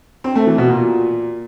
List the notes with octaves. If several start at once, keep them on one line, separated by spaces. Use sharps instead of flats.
C4
A3
E3
B2
A#2